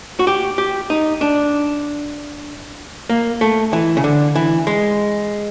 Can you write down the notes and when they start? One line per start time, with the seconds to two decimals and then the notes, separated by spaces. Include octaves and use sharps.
0.19 F#4
0.27 G4
0.58 G4
0.90 D#4
1.21 D4
3.09 A#3
3.41 A3
3.73 E3
3.97 C#3
4.04 D3
4.36 E3
4.67 G#3